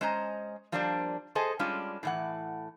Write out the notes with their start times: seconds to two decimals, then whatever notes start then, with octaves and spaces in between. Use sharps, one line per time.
0.01 G#3 C#4 C5 D#5 A#5
0.72 F3 G3 A#3 D4 C5 D5
1.35 G#4 A4 C5 D#5 G#5
1.59 G3 G#3 C#4 D4 F4
2.03 A2 E3 F#5